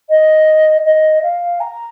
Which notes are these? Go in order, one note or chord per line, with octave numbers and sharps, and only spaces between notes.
D#5
D#5
F5
A#5